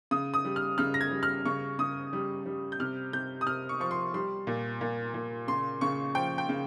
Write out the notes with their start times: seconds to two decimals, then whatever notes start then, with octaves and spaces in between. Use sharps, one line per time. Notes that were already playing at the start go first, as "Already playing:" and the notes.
0.11 C#3 D#6
0.34 D#6
0.45 G3
0.56 F6
0.78 C#3 F6
0.94 A#6
1.01 G#6
1.11 G3
1.23 F6
1.45 C#3 C#6
1.79 C#3 D#6
2.13 G3
2.46 G3
2.72 G6
2.79 C3 F6
3.13 C3 G6
3.41 D#6
3.47 C3 F6
3.69 C#6
3.80 F3 C#6
3.91 C6
4.14 G3 C6
4.47 A#2
4.81 A#2
5.14 A#2
5.48 C#3 C6
5.81 C#3 C#6
6.15 F3 G5
6.38 G5
6.49 C#3